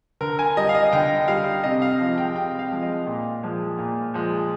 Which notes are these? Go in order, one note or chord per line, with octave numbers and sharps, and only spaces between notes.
D3 A#4
G#5
G3 D#5
F5
D#5
D3 G5
G3 F5
C3 D#5
F5
F3 G#3
G5
C3 G5
F5
F3 G#3
D#5
A#2
F3 G#3
A#2
F3 G#3